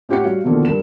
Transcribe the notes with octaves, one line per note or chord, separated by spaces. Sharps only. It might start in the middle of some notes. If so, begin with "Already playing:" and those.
A2 C#4 G4 C#5 F#5 C#7
G3 F#4 F5
B2 D3 D#3 F3 A#3 A4
G2 A#4 E7